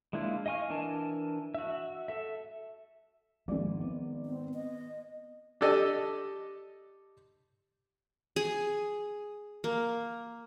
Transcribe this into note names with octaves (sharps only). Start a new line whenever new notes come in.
G#3 A#3 D4 E4 F4
D#5 F5 G#5 C#6 F6
E3 D4 A#4 G#5 A5
F#4 E5
A4 E5
G#1 F3 G#3 D5
B3
C4
D#5
D4 G4 A4 D5 D#5
G#4
A#3